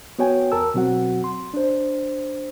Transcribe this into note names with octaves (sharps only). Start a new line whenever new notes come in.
B3 F#4 C#5 G5 G#5
E2 A#4 A5 E6
B2 F#3 C4 F#4 F#5
C6
D4 C5